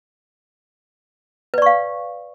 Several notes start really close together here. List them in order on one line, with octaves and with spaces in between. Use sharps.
B4 D5 C#6 F5